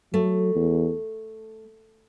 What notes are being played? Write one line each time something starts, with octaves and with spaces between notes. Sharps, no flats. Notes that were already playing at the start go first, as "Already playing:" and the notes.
F#3 A3
E2